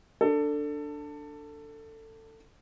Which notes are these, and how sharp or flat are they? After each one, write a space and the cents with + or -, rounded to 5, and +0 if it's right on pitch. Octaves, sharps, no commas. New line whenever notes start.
D4 +0 A4 +20